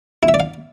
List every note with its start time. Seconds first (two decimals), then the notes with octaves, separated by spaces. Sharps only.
0.23 E4
0.28 E5
0.34 D5
0.40 F5